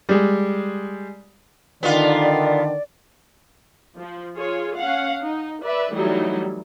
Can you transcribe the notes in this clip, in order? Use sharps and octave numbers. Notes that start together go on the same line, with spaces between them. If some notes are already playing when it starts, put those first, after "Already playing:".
G3 G#3
D3 D#3 B3 F4 D5
F3
F4 G#4 C#5
C#4 F5 F#5
D#4
B4 D5 E5
E3 F#3 G3 A3 D#4 E4